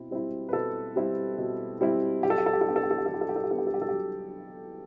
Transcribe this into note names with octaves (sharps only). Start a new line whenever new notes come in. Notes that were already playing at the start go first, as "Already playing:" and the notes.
Already playing: B2 C4 E4
G3 C4 E4
B4
B2 A4
G3 C4 E4
B2
G3 C4 E4
F#3 G4
A4
G4
A4
G4
A4
B3 D4 G4
A4
G4
A4
G4
A4
F#3
G4
A4
G4
A4
G4
B3 D4 A4
G4
A4
G4
A4
G4
F#3